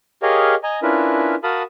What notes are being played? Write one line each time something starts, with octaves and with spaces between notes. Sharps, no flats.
G4 G#4 A#4 C#5 D#5 F5
D#5 G#5 A#5
C#4 D4 E4 F4 A#4 B4
F#4 A#4 F5 A5 B5 D#6